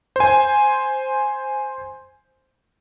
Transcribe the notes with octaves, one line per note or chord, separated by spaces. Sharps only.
C5 G#5